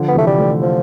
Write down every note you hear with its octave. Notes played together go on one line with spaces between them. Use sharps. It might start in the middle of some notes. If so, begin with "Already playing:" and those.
Already playing: D3 F3
B3
C3 E3 A3
G3
A3 C4
F3